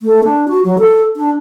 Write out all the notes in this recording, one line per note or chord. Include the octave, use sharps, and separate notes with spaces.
A3
D4
F#4
F#3
A4
D4